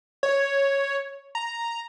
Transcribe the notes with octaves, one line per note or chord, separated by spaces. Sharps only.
C#5
A#5